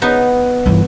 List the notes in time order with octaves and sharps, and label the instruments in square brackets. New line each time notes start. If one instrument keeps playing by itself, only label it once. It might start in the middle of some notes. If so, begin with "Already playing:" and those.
[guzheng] B3 D#4
[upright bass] G1 E3